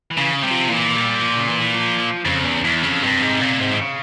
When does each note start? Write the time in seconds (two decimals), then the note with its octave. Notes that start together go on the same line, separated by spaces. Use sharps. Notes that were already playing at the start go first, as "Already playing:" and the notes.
0.11 E3
0.18 C#3
0.43 C3 G3
0.50 F3
0.69 A#2 E3
0.95 G3
1.21 F3
1.37 C#3
1.47 E3
1.62 E3
1.74 F3
1.98 F3
2.25 F2 C#3
2.44 E2 C#3
2.64 E2 E3
2.83 F2 C#3
3.03 G2 C3
3.22 G#2
3.41 A#2
3.61 G#2
3.72 E3
3.81 C#3